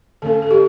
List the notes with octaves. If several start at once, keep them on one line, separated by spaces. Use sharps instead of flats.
D3 A3 C#4 A4
A4
G4